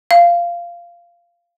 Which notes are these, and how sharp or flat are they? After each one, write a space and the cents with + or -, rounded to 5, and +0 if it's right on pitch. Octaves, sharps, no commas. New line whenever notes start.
F5 -15